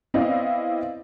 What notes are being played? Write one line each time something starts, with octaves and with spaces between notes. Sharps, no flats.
B3 C4 E4 D5 D#5 F5